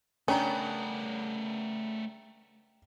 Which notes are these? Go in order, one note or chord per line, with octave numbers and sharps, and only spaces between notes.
C#3 A3 B3 C#4 D4 A#4 G5 A#5